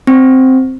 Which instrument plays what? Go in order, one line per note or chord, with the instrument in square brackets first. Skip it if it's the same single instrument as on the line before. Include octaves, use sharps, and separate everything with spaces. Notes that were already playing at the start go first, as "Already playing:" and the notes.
[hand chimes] C4